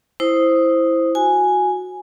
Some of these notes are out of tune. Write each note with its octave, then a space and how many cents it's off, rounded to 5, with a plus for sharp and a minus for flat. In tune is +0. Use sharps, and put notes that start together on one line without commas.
E4 +0 C5 +0 D#6 +0
F#4 -15 G#5 +0